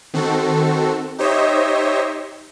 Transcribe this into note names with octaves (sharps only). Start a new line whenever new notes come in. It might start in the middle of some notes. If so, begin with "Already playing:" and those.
D#3 C4 F#4 A4
D#4 G4 C5 C#5 D#5 E5